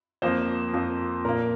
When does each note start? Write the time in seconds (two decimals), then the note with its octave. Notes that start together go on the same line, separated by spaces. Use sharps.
0.22 F2 F3 A#3 C5
0.73 F2 F3 A#3
1.25 A#2 A#3 A#4